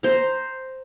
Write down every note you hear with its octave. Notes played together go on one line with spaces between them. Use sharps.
C5 A#5